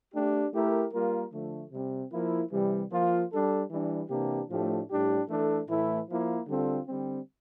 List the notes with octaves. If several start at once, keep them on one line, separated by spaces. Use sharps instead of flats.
A3 D4 G4
A3 E4 G4 A#4
G3 A#3 F4 A#4
D3 F3 A3
C3 G3 C4
F3 A#3 E4
C3 E3 G3
F3 A#3 F4
G3 D4 A4
E3 G3 D4
C3 E3 A#3 D4 G4
A2 F3 A3 D4 G4
A2 G3 D4 G4
E3 A3 D4 A4
A2 E3 A3 E4
F3 A#3 E4
D3 G3 C4 F4 A4
D3 G3 C4